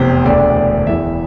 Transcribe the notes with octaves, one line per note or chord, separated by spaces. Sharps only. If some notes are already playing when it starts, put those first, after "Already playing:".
Already playing: F1 E2 C3 C5
E1 D2 D3 D5
D5
E1 E2 E3 E5